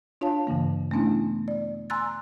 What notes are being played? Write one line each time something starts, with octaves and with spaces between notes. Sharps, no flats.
D4 F4 C#5 F5 A5
G2 C#3 E3 A#3
A3 B3 C#4 D4 E4
D5
G#5 A#5 C6 E6 F#6 A6